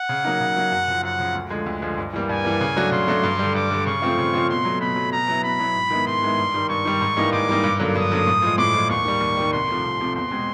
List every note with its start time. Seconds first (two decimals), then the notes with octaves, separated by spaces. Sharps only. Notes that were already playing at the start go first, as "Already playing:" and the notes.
Already playing: F#5
0.09 C#3
0.25 F#3 A#3 D#4
0.41 C#3
0.56 F#3 A#3 D#4
0.72 F#2
0.87 C#3 F3
1.03 F#2 F#5
1.19 C#3 F3
1.35 D2
1.50 D3 F3 G#3
1.66 D2
1.82 D3 F3 G#3
1.98 G2
2.13 E3 G3 A#3
2.29 G2 G#5
2.45 E3 G3 A#3
2.61 C#3
2.77 F#3 A3 D4 F#4
2.92 C#3 C6
3.08 F#3 A3 D4 F#4
3.23 G2
3.39 D3 G3
3.55 G2 D6
3.71 D3 G3
3.86 C#3 C#6
4.02 F3 A3 C4 F4
4.18 C#3
4.34 F3 A3 C4 F4
4.49 B2 C6
4.65 F#3 A3
4.81 B2 B5
4.96 F#3 A3
5.12 B2 A#5
5.28 F#3 B3 E4
5.44 B2 B5
5.59 F#3 B3 E4
5.75 G#2
5.91 D#3 G#3 B3 E4
6.06 G#2 C6
6.22 D#3 G#3 B3 E4
6.38 G2
6.54 D#3 G3
6.69 G2 C#6
6.85 D#3 G3
7.01 G#2
7.17 E3 G3 A#3 D#4
7.32 G#2 D6
7.48 E3 G3 A#3 D#4
7.64 G2
7.80 D3 F#3 A#3
7.95 G2 D#6
8.12 D3 F#3 A#3
8.27 A2
8.42 F3 G#3
8.58 A2 D6
8.74 F3 G#3
8.89 D#2 C#6
9.05 D#3 G3
9.21 D#2
9.37 D#3 G3
9.53 C2 C6
9.68 C3 F3 A3
9.84 C2
10.00 C3 F3 A3
10.15 E2 C6
10.31 B2 G#3 C4